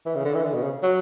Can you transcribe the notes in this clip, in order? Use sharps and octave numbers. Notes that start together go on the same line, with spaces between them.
E3
C#3
D3
E3
D3
B2
C#3
F#3